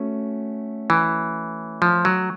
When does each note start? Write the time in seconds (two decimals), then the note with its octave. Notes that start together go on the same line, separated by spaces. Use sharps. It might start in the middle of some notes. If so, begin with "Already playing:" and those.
Already playing: A3 C#4 F#4
0.90 E3
1.82 F3
2.05 F#3